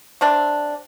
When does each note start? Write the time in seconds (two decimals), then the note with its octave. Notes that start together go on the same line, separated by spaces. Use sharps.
0.21 C3 C4 D4